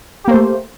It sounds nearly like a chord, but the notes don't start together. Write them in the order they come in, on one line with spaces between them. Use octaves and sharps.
G4 A#3 C5 A3